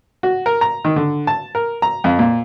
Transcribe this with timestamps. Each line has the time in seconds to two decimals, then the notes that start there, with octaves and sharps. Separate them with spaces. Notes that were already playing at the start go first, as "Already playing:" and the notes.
0.23 F#4
0.46 A#4
0.61 A#5
0.85 D#3
0.96 D3
1.27 A5
1.55 A#4
1.82 A#5
2.04 F2
2.19 A#2